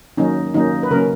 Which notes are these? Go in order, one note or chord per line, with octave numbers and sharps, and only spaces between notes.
D#3 F#3 A#3 C#4 D#4
D#3 F#3 A#3 C#4 D#4
B4
C#3 F#3 A#3 C#4 A#4